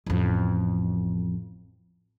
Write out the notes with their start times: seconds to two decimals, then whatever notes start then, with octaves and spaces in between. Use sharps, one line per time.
0.06 A1 F2